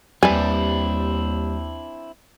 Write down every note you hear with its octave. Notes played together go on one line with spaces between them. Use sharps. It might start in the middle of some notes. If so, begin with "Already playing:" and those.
D#2 G3 C4 D4 E4 B4 G#5